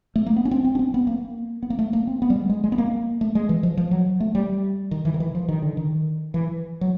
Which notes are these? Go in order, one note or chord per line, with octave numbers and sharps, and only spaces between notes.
A3
A#3
B3
C#4
C4
C4
C#4
C4
B3
A#3
B3
A#3
A3
A#3
C4
B3
G3
G#3
G#3
G#3
B3
A#3
A3
G#3
E3
F3
F3
F#3
A3
G3
D#3
E3
D#3
E3
F3
D#3
D3
D#3
E3
F#3